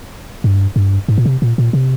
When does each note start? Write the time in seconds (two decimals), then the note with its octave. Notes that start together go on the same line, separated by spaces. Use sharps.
0.44 G2
0.76 G2
1.08 G#2
1.18 A#2
1.26 C3
1.42 A#2
1.58 A#2
1.73 C3